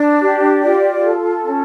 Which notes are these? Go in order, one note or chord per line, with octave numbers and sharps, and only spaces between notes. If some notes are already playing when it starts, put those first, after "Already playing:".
Already playing: D4
G4
F4 D5
A4
C#4